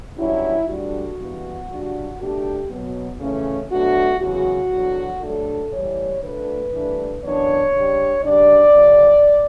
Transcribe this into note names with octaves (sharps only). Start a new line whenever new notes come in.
G2 F#3 C#4 E4
D2 D3 G3 D4 F#4
G2 E3 B3
C#3 G3 D4
B2 A3 D4 G4
B2 F#3 B3
C#3 E3 A3 C#4
B2 F#3 A3 D4 F#4
E2 C#3 F#3 F#4
E2 D3 F#3
G2 F#3 A3 D4 A4
A2 E3 G3 C#5
D2 D3 A3 B4
G2 E3 A3 D4
F#2 E3 B3 D4 C#5
C#3 G3 D4
C#3 G3 D4 D5
F#2 C#3 F#3 C#4